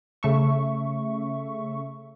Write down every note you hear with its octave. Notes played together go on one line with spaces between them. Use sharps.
C#3 A3 E5 C#6